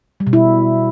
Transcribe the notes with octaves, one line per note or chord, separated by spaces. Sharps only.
G3
B2
E4